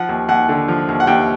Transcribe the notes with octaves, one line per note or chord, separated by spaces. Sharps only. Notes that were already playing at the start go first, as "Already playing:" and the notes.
Already playing: F3 F#5
D#2
D#2 F#5
D3
F3
D#2
F#5
D#2 G5